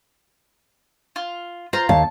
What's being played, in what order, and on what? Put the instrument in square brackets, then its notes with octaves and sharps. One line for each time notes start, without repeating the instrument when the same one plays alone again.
[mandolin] F4
[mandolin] F4 A#5 [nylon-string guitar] C5
[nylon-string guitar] D#2 C#5 F5 [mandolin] A5